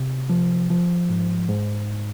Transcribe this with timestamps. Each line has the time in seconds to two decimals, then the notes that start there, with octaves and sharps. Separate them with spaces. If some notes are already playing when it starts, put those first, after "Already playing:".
Already playing: C3
0.30 F3
0.70 F3
1.09 G#2
1.49 G#2